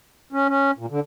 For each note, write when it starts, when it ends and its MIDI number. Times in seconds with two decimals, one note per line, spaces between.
0.33 0.48 61
0.49 0.71 61
0.79 0.86 46
0.91 1.00 50